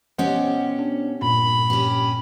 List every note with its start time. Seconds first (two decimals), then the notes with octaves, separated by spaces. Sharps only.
0.18 B2 C#4 G4 C5 D#5 F#5
0.79 D4
1.22 G2 A#2 B5
1.70 C#4 G4